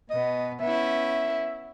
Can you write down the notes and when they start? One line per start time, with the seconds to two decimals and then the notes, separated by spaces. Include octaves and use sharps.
0.11 B2 B3 D#5
0.61 B3 C#4 E4 E5